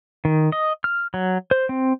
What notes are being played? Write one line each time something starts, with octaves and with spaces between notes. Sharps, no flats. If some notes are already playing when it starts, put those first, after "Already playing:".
D#3
D#5
F6
F#3
C5
C4